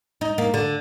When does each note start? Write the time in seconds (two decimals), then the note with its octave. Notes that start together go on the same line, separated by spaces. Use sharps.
0.21 D#4
0.38 A#3
0.54 D3